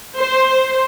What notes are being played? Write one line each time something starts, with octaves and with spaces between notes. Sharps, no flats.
C5